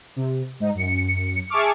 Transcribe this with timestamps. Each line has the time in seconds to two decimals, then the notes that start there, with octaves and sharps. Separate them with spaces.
0.16 C3
0.60 G#2 D#4
0.75 F#2 C#7
1.49 G#4 E5 A5 C#6 D6 F6